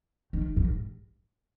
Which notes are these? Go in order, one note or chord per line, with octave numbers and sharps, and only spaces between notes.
D#3
G#2